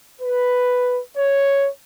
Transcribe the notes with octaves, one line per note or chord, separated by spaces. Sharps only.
B4
C#5